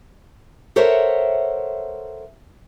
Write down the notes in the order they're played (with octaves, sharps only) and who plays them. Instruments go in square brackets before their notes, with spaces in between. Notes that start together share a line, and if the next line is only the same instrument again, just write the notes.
[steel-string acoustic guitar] A4 A#4 C5 C#5 E5 F#5